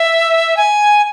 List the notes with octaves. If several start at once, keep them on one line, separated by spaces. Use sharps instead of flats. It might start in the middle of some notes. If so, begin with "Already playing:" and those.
Already playing: E5
G#5